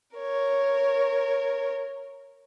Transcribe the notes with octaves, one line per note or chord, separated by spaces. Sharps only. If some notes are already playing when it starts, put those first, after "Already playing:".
A#4 C#5